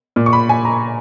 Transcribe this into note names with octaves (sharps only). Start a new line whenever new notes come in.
A#2
C#6
B5
G#5
A#5